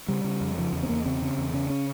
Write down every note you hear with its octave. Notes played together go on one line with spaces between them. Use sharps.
C#3 G3
C#3
F2
C#3 F3
E2
C4
E2 A#3
C#3 C4
C#3
E2
C#3 C#4
C#4